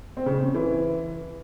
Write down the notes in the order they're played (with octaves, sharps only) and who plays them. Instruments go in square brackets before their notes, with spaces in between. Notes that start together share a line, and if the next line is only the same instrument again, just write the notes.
[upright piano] C4
C#3
C4
C#4
E3